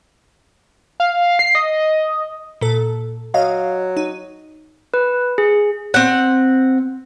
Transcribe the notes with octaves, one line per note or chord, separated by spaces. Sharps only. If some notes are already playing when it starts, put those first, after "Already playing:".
F5
C7
D#5
A#2 A4
F#3 D#5 F5
D#4
B4
G#4
C4 F#5